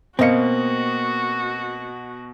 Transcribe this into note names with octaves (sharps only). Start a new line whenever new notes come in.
B2 A#3 C4 F#4 D#5 C#7